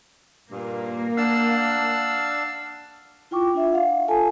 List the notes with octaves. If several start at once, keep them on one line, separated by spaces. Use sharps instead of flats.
G2 A#2 A#3
D4 F5 F#5 A5 E6
E4 F4 G5 C#6 D6
D4 F4 E5
F5 F#5
F4 A4 G#5 A5